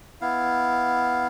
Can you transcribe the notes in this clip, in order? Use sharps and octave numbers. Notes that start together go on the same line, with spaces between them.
B3 E4 F5